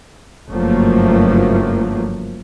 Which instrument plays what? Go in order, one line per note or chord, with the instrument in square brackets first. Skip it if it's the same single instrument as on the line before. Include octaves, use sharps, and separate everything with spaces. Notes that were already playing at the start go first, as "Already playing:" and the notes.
[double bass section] F#1 G2 F3 F#3 A3 A#3